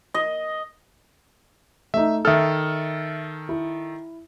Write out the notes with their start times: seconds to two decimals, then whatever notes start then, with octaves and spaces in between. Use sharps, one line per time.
0.14 D#5
1.94 A3 D#4 E5
2.25 D#3 A4 E5 D#6 F6
3.49 E4